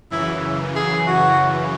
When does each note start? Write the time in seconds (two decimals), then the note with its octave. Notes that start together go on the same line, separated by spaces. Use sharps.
0.11 F#2 C#3 E3 E4
0.76 G#4
1.07 F#4